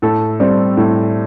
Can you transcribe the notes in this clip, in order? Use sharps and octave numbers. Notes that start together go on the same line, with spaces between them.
A2 A4
G3 C4
A2